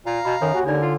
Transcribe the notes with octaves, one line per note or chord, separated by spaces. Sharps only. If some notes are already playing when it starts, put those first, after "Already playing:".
A#2 F5 A#5
B2 B5
F#2 D#3 A4 C#5
D#2 F#4 G#5
D3 D4 D#4 A#4 D5
F4